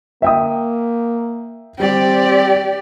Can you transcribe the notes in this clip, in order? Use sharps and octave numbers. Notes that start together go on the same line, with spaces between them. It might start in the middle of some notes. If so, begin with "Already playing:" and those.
A#3 E5 G5 D#6
G3 C4 G4 D5